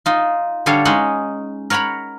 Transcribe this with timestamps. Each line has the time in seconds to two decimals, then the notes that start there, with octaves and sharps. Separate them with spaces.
0.06 D#4 F4
0.66 D3 G3 A4 C#5 F5
0.85 G#3 C#4 D#4 F#5
1.70 A#4 C#5 F#5 A#5 B5